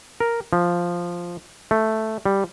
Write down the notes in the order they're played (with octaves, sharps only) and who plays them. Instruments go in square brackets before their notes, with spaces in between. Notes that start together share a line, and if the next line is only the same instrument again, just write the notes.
[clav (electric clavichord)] A#4
F3
A3
G3